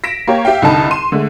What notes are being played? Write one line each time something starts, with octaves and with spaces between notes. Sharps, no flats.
A#6 B6 D7 E7
A#3 G4 C#5
G4 E5 F5 G5
C2 D3 D#4 A5 B5
C6 D#7 E7
D3 G#3 A3